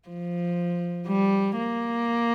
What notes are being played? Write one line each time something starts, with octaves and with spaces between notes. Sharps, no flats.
F3
G3
A#3